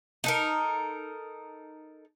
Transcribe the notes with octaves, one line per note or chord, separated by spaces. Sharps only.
D#4 A4 A#4